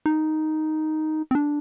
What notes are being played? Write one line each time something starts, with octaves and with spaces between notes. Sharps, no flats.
D#4
C4
D4